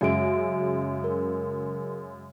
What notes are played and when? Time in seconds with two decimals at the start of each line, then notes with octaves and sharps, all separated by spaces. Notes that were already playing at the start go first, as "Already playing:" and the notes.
0.01 F#2 C#3 G#3 F#4 E5 D7
1.04 A#4